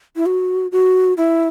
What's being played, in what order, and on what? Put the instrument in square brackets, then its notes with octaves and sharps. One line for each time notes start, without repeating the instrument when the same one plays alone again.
[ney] E4
F#4
F#4
E4